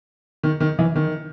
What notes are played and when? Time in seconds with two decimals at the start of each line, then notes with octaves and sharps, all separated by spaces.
0.43 D#3
0.60 D#3
0.79 E3
0.96 D#3